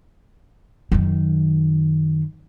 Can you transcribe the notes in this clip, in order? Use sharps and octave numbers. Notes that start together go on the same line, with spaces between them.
F#2 D#3